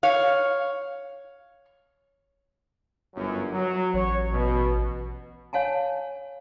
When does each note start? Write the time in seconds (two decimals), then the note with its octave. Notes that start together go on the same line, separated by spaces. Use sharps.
0.03 C#5 F5
3.14 G1 F#2
3.52 F#3
3.94 A1 C#5
4.31 B2
5.53 C#5 F5 G#5 A5